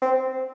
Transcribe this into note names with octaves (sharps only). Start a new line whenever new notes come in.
C4